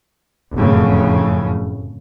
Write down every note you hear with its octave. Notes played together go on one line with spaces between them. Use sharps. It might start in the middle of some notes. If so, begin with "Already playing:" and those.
F1 F#2 A2 C#3